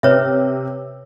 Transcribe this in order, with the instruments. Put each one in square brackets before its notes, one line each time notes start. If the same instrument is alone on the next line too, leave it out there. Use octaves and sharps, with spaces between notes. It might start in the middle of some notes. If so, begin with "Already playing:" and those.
[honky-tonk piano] C3 [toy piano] B4 C#5 E5